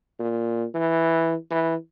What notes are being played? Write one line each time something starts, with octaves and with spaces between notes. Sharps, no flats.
A#2
E3
E3